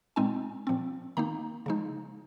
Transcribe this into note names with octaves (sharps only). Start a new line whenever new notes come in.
A#2 G#3 C4 D#4 G#5
A#2 F3 C4
D#3 A#3 D#4 A#5
C#3 F3 G#3 D#4